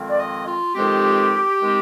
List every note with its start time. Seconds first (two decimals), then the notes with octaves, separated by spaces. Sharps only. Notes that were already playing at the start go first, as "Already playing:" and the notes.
Already playing: F2 D#3 G#3 C4
0.09 D5
0.18 D#5
0.46 F4
0.75 F2 D#3 G#3 C4 G4
1.60 D#3 G#3 C4